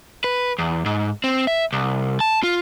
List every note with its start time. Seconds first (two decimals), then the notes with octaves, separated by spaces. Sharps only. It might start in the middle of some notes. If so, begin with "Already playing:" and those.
0.24 B4
0.59 E2
0.86 G#2
1.24 C4
1.47 E5
1.73 C2
2.20 A5
2.43 F4